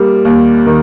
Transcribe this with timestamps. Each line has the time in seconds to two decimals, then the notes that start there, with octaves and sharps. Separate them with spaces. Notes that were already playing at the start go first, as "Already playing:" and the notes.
Already playing: G3 A#3
0.25 D#2
0.66 D#3